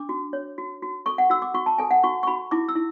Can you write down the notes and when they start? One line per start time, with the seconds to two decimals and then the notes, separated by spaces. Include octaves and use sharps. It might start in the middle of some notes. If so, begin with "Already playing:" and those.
Already playing: D4 D6
0.09 F#4
0.33 C#5
0.58 F#4
0.83 F#4
1.06 A4 C#6
1.18 F#5
1.30 F#4 E6
1.42 D6
1.54 F#4 C#6
1.66 A5
1.78 A4 G#5
1.91 F#5
2.03 F#4 C#6
2.23 C#6
2.27 F#4 B5
2.51 E4 D6
2.68 E6
2.76 E4